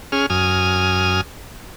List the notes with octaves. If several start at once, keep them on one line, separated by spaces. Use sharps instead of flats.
C#4 G#4 F6
F#2 G#5 D#6 F6